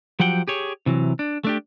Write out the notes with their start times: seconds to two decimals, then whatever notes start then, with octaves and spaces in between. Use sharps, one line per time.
0.20 F3 F#3 G4 F#5 G5
0.48 G4 G#4 C#5
0.86 C3 E3 F#3
1.19 D4
1.44 A3 D4 G4